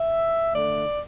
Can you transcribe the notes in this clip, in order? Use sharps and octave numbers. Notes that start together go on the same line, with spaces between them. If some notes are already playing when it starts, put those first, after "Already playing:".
Already playing: E5
D3 A3 D5